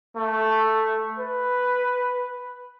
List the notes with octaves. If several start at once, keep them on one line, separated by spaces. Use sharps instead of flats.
A3
B4